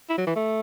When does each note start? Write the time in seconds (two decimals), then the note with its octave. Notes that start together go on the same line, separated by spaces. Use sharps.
0.09 E4
0.18 F#3
0.27 E3
0.35 A3